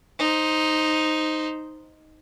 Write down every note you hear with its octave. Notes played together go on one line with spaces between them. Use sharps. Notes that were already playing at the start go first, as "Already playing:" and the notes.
D#4 C5